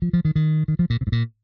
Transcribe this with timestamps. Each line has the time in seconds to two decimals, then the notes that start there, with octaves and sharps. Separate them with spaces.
0.02 F3
0.13 F3
0.25 D#3
0.36 D#3
0.68 D#3
0.79 F3
0.90 A#2
1.01 C3
1.07 G#2
1.12 A#2